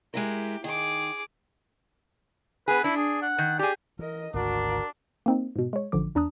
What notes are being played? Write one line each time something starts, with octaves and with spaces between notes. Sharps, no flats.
G#3 E4 G4 A#4
D#3 G#4 D6
B3 G#4 B4
D4 E4
G#4
F#5
D#3
G4 G#4 D5
E3 A#4 D#5
G#1 D2 G#2 D4 F#4 A#4
A#3 C4 D#4
G#2 B2
G#3 C#5
A1 D3 F3 D6
E2 D4 A5 A#5 D#6 F#6